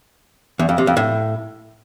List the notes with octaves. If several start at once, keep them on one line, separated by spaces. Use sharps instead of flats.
E2
F2
C3
F2
A2